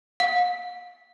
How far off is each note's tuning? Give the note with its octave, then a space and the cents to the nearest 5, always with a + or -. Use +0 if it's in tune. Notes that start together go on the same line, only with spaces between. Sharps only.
F5 +40